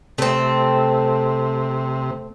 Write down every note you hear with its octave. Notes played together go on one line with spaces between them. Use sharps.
C3 A3 C4